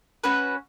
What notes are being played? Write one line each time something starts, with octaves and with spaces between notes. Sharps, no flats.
C#4 F#4 B4